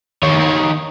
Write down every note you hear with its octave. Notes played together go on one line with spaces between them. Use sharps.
D#3 C#5